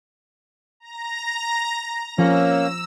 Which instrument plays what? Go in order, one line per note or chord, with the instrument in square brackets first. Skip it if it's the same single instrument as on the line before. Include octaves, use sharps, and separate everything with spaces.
[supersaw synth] A#5 A#6
[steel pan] F3 [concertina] A#3 [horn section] C#4 [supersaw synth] E6